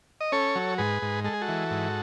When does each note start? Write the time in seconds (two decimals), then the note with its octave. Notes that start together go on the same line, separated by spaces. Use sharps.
0.21 D#5
0.32 C#4 A4 C#5
0.55 F#3
0.78 G#2 G#4 B4
1.02 G#2
1.24 G#3 A4
1.33 G#4
1.41 F#4 A4
1.48 E3
1.71 G#2